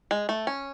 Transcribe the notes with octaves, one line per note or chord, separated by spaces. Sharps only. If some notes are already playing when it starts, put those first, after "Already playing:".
G#3
A3
C#4